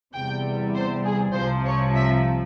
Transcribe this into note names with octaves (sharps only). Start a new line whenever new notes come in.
E2 C3 G3 G5
C5
G#4
C2 C3 F3 C5
C#5
E5